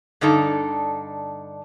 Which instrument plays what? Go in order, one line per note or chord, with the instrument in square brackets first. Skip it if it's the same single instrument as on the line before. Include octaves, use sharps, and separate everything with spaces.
[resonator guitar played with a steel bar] G2 D3 D4 D#4 A4